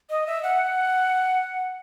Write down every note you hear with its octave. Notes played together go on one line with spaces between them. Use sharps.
D#5
E5
F#5